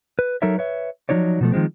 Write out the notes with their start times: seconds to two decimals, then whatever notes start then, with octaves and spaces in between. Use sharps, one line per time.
0.19 B4
0.42 F#3 D#4 A4 A#4 C#5 E5
0.58 B4 C#5 E5
1.09 F3 F#3 D#4 C#5 D5
1.41 B2 F3 A3
1.52 D#3 F3 G#3 C4